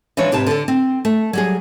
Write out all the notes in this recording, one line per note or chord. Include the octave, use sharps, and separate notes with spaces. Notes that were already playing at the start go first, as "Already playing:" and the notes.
E3 F3 G#3 D4 C#5
G#2 C3 G4 B4 A5
D3 A4
C4
A3
F#3 G3 G#4